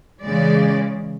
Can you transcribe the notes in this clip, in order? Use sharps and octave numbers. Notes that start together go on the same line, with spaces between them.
C#3 E3 G#3 D5